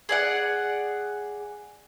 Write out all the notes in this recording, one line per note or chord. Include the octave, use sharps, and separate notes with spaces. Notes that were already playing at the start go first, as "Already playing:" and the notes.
G#4 D5 F#5